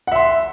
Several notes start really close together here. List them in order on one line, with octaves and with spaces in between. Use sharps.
F#5 E5 C6